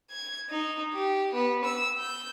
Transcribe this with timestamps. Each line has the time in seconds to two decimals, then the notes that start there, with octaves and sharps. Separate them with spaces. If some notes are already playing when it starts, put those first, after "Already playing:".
0.11 G#6
0.49 D#4
0.93 G4
1.33 B3
1.65 E6
1.99 G6